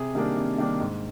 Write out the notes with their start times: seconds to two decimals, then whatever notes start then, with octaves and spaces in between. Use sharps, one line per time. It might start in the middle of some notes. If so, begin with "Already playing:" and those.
Already playing: C3 G#4
0.15 D#3 G3 A#3 D4
0.36 C3
0.58 D#3 G3 A#3 D4
0.80 G#2